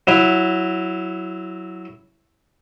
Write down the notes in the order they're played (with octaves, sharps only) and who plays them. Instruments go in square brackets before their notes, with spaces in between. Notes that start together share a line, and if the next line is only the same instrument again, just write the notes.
[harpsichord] F#3 E4